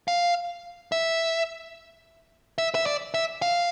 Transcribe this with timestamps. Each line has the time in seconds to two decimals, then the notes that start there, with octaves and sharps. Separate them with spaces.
0.08 F5
0.92 E5
2.58 E5
2.75 E5
2.86 D5
3.14 E5
3.42 F5